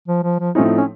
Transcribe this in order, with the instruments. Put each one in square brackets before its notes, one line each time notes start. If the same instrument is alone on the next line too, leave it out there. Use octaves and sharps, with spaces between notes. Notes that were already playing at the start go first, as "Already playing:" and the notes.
[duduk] F3
F3
F3
[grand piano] A2 F3 A3 C4 D#4 [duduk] C#4
[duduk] C#4